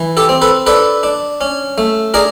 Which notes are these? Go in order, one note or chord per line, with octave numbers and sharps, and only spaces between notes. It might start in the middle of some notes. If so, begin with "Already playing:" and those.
Already playing: E3
G4 A4
C4
A4 B4
D4 A4 B4
D4
C#4
A3
D4 G#4 A#4